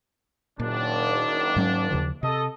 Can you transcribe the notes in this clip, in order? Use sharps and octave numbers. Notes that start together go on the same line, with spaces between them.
F#1 A#2 D#3 D4
G#2 F#3 C#4
D#2 C#3 F3
C3 A4 D#5